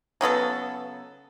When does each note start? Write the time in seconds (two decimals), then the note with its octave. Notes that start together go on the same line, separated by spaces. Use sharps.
0.21 C#3 F#3 B3 A4